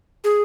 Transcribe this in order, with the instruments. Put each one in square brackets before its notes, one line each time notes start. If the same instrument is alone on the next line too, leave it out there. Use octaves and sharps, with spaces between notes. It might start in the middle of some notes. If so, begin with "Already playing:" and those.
[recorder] G#4